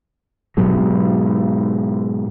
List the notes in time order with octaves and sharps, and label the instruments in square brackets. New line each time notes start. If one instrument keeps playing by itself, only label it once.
[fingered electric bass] G#2 B2 F#3 G#3